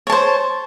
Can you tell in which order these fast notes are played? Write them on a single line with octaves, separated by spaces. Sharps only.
C#5 A5 C5